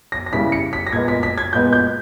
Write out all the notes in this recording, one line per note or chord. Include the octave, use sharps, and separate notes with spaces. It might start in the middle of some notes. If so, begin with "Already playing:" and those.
A#6
A#6
C#3 G3 C#4 E4 B6
C#7
B6
A#6
A#2 G#3 B3 G#6
B6
B6
G#6
A#2 G#3 B3 G6
G6